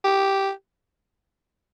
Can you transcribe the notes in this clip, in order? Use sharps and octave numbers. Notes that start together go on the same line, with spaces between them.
G4